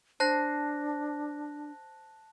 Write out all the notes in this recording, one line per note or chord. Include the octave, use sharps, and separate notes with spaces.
D4 C5 A5 F#6 A#6